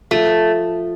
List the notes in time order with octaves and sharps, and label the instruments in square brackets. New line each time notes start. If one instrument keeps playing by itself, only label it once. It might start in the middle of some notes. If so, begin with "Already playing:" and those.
[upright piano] F3 [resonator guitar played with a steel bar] A3